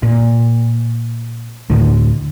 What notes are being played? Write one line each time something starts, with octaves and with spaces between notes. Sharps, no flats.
A#2
D2 A2 D3